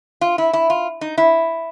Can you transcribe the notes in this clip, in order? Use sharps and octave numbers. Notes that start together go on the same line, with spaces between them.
F4
E4
E4
F4
D#4
E4